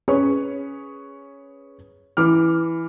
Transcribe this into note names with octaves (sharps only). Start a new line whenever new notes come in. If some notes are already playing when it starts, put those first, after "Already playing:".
C#4 G#4 B4 C#5
E3 D6 F6